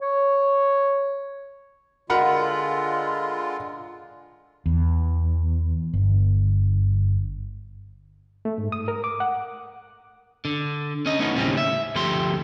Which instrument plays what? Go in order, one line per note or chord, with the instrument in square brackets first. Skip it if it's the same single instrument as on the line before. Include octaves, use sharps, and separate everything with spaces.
[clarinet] C#5
[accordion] D3 G#3 F4 [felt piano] A#4 F#5 B5
[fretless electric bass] E2
G1
[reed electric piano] A3
G#2
D#6
A#4
D6
F#5
[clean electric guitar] D3
C#4 D#5
A3 B3 C#4 D#4
D#2 A2 C#3 G3 C4 C#4
E5
D2 F3 A3 G4 C6